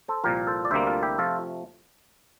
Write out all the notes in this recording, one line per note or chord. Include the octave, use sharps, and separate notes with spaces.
A4 C5
C2 A#2 F3 G4 A#4
A4 C5
D5
D2 C3 G3 A#3 C5 E5
F4 A4
E4 G4
C3 F3 A3 F4 A4